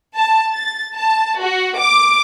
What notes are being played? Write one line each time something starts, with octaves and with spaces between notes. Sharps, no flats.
A5
A6
A5
F#4
D6